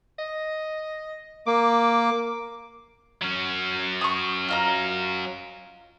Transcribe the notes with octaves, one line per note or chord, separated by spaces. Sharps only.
D#5
A#3 D6
F#3 C#4
C#6 D#6
F4 D#5 A#5